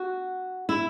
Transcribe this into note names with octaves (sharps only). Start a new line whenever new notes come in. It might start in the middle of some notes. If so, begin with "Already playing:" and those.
Already playing: F#4
E4